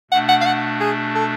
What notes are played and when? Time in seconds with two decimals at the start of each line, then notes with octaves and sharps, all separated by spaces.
0.11 B2 A3 D4 F#5
0.29 F#5
0.41 F5
0.46 F#5
0.81 G#4
1.15 A4